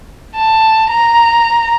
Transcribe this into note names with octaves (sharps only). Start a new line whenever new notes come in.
A5
A#5